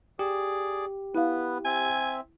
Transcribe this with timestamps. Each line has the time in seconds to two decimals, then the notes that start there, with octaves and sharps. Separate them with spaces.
0.19 G4 G#4 D5 D6
1.15 B3 E4 B4 F5
1.65 C4 E5 G#5